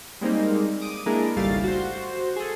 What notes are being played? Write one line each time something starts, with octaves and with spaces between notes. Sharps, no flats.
G3 G#3 A#3 C4 D#4
D6 D#6 D7
G#3 A#3 D4 E4 A#4
G#1 C#2 G3 A3 F5 A6
F#4 C5
G#4 A4